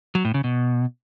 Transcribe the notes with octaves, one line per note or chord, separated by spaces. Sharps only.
F#3
A2
C#3
B2